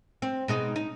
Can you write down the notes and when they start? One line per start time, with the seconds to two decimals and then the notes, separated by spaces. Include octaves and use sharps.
0.22 C4
0.48 B2 G#3 D#4
0.76 D#4